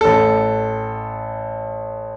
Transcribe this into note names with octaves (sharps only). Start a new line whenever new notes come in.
A1 A4